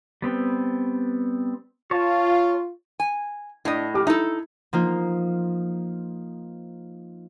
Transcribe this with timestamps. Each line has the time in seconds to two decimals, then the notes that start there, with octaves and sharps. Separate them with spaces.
0.22 G3 B3 C4
1.91 F4 C#5 A5
3.00 G#5
3.65 A2 D4 D#5
3.94 G4 D6 F6
4.07 D#4 E4 A4
4.73 F3 A#3 D#4 F4